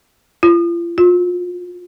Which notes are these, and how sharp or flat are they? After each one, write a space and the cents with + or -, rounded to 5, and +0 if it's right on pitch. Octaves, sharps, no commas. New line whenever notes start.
F4 -40
F4 +35